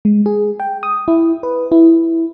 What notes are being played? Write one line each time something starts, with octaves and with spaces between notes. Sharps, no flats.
G#3
G#4
G5
D#6
E4
B4
E4